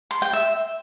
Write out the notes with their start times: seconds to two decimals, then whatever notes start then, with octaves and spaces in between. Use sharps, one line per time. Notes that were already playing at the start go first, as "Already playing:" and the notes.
0.11 C6
0.22 G5
0.33 E5